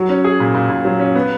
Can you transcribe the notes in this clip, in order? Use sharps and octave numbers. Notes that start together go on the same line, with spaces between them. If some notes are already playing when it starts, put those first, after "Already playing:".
Already playing: F#3 F#4
C#4
G#4
A#2
A#2
A#2
F#3
C#4
B3